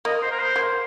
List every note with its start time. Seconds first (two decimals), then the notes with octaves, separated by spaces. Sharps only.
0.05 A#3 D#5
0.22 C5
0.31 A#4
0.39 C5
0.56 A#3